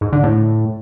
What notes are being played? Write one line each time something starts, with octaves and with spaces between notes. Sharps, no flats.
G#2
D3
A2